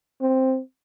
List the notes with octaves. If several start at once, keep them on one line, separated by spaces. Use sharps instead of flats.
C4